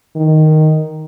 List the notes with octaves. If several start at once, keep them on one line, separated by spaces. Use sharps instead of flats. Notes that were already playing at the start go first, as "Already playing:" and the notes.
D#3